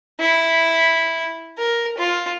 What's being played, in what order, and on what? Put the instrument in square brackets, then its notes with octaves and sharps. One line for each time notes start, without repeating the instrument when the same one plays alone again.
[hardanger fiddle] E4
A#4
F4